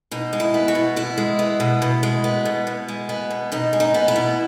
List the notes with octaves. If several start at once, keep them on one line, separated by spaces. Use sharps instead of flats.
B2 D#4
G#3
E4
B3
F#4
B2
B2 E4
G#3
B3
B2
B2
G#3
B3
B2
B2
G#3
B3
B2
B2 D#4
G#3
D#4
B3
E4
B2